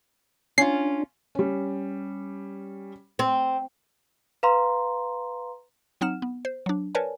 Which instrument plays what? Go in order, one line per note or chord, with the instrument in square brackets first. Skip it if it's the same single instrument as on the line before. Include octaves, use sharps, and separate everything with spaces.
[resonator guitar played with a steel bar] C#4 F4 [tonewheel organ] D4 [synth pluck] C7
[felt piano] G3 C#4
[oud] C4
[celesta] B4 F5 A#5 C6
[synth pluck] F#3 C4 D#4 F#5 F6 E7
B3
C5
F#3 D4
A#4 B4 C#5 D5 G#5 A5